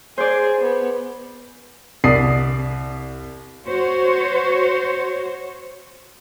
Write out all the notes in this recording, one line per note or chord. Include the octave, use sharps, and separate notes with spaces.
G#4 C5 D5
B3
C2 D5 D#6 C7
F#4 C5 C#5